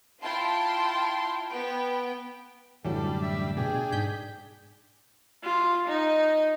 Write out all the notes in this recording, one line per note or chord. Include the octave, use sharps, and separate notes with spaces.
E4 F4 G5 A5 C6
B3 G5
F#2 A2 D3 E3 F#3 G3 D4 A4
E5
B2 D4 G#4 G5
G#2 G6 B6
F4
D#4